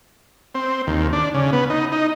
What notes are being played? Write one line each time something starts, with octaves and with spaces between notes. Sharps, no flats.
C4
D#2
D4
C#3
B3
D#4
D#4